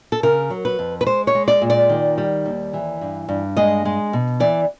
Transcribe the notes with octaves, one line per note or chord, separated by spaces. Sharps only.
A4
C#3 A#4
F#3
B4
F2
B4
G#3 C5
C#5
G#3
D5
A#2
D5
D#3
G3
D#2
E3
G2
G2
G#3 D#5
G#3
B2
E3 D5